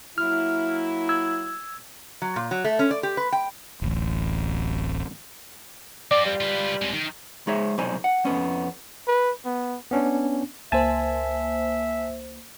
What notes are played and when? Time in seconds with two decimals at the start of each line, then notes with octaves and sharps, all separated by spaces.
0.18 F#3 A#3 E4 F6
1.09 E6 G#6
2.22 F#3
2.36 A#2
2.51 F#3
2.64 A3
2.79 C#4
2.91 D5
3.03 G4
3.17 B4
3.32 G5
3.82 D1 A1
6.11 C4 F4 D5
6.26 G3
6.41 F4 B4
6.81 C3 G#3
6.93 D#3
7.47 G#3 D#4 G#4 C5 C#5 E5
7.78 C2 B2 F#3 D#4 C5 G#5
8.04 F#5
8.25 F2 B3 C#4
9.07 B4
9.45 B3
9.91 B3 C#4 D4
10.72 C#2 A#3 C5 E5 G#5 A5